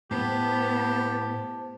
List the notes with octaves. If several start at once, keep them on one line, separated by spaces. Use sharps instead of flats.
A2 B3 G4 C5 A5